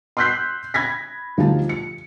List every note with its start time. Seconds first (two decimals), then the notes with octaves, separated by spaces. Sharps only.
0.17 C6 E6 F#6 G6 B6 C7
0.74 B5 G#6 A#6 B6
1.37 D2 F3 D#4 F4 G4 A5
1.69 C#7